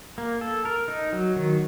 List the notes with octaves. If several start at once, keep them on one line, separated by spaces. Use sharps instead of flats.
A#3
A4
A#4
D#4
F#3
D#3